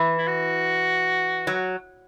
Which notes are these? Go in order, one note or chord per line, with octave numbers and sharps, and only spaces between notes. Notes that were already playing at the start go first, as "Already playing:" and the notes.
Already playing: E3
E4
F#4
F#3